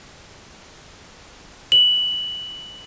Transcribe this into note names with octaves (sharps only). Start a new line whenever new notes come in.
F#7